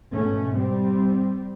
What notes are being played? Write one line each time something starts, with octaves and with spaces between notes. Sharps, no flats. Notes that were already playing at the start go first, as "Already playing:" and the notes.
G#2 B2 A3 C#4
G3 C4